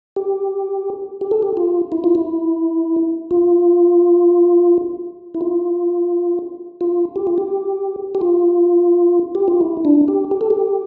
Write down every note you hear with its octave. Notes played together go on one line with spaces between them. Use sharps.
G4
G4
A4
G4
F4
E4
F4
E4
F4
E4
F4
F4
G4
F4
G4
G4
F4
G4
F4
E4
D4
G4
G4
A4
G4